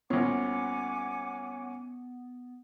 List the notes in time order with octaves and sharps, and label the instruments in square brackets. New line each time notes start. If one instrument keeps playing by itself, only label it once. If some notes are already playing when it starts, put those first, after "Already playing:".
[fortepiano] C2 A#2 [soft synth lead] B3 [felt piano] C#4 [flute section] F#5 G#5 D6